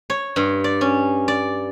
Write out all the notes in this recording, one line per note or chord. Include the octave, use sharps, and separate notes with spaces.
C#5
G2
D5
C#4
D5